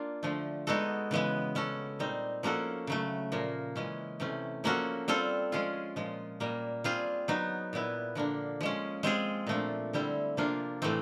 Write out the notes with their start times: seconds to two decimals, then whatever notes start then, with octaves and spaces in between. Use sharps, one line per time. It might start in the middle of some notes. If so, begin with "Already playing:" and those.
Already playing: A#3 D4 F4
0.23 D3 F3 A3
0.67 G#3 B3 D#4 F#4 A4
1.11 C#3 E3 G#3 B3
1.55 G#3 C#4 F#4 A4
1.99 A#2 G3 C4 D#4
2.43 F3 A#3 C#4 F#4 A4
2.87 C#3 F#3 A3
3.32 A#2 F3 A#3
3.76 E3 G#3 C#4
4.20 C3 E3 A3 C#4
4.64 F3 A#3 C#4 F#4 A4
5.08 G3 C4 F4 A4
5.52 F3 G#3 C#4 F4 G#4
5.96 A#2 F3 G#3
6.40 A#2 G3 A#3
6.84 G3 C4 F4 G#4
7.28 F#3 B3 D#4
7.73 A#2 G3 B3 E4
8.15 D3 F3 A#3 D4
8.61 F3 G#3 C#4
9.03 G#3 C4 F4 G#4
9.47 A#2 F3 A3 D4
9.93 D3 G3 C4 E4
10.37 C3 F3 A#3 D4 F4
10.82 A2 E3 A3 C4